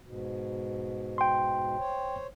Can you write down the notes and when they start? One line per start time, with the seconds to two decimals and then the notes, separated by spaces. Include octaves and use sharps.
0.03 G#2 B2
1.18 G5 C6
1.78 C5 C#5